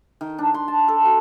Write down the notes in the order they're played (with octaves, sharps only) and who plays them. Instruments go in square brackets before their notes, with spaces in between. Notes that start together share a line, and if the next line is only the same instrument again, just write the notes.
[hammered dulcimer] D#3
D4
C6
A5
A4
F#4